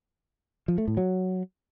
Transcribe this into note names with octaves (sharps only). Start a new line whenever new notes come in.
F3
A3
A2
F#3